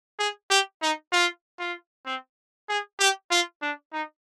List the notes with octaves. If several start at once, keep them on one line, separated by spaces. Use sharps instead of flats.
G#4
G4
D#4
F4
F4
C4
G#4
G4
F4
D4
D#4